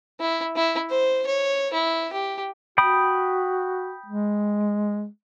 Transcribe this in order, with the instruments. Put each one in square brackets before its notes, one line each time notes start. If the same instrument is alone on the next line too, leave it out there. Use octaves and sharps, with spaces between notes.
[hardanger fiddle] E4
E4
C5
C#5
E4
G4
[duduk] F#4 [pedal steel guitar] G5 B5 D#6
[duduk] G#3